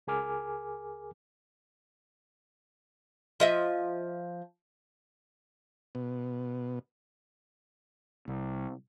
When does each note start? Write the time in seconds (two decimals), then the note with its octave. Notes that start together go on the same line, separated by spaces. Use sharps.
0.07 C#2 G#4 A#4 G#5 D6 F6
3.40 F3 D#5 E5
5.95 B2
8.28 C2